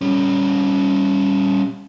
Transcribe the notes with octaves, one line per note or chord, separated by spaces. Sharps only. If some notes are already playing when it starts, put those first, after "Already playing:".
G3 C#4